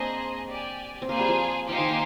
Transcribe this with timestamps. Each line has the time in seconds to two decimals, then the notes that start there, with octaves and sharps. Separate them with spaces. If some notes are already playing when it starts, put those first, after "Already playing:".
Already playing: A#3 C4 D4 G#4 C5 D#5 G#5
0.49 G4 D5 G#5
1.02 C4
1.09 A#3 F4 G#4 C5 F5 G#5
1.19 G3
1.29 F3
1.69 F3 D#4 G4 C5 F5 G#5
1.78 D#3
1.89 A#3